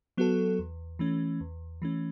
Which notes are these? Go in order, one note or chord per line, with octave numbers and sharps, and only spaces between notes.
F#3 B3 F#4 A4
E2
E3 A3 C#4
E2
E3 A3 C#4